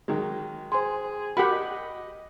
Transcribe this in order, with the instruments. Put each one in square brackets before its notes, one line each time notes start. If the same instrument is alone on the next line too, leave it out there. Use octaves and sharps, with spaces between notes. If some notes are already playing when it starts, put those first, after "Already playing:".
[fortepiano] D#3 F#3 G#3
[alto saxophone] G#4 [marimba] C5 G#5 C6
[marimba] F#4 [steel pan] G4 F#5 B5 [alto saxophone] A#4
[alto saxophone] D#5